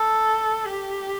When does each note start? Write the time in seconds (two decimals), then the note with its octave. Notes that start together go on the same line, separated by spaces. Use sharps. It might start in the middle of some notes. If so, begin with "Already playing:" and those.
Already playing: A4
0.65 G4